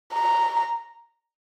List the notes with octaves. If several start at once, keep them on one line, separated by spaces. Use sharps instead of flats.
A#5